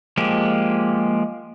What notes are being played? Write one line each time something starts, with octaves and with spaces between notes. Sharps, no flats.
F3 G#3 A#3 G4